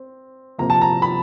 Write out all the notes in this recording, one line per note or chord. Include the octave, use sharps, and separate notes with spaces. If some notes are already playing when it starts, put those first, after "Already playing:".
Already playing: C4
C3 F3 A#3 A#5
A5
A#5
B5